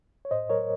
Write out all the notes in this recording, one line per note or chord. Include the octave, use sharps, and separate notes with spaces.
C#5
A2 C5 D#5
F#3 A#4 C#5